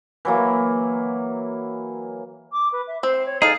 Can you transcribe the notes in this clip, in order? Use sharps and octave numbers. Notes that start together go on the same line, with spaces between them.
E3 F#3 A#3
D6
B4
E5
C4 C5
C#5
D#4 G#4 A4 F5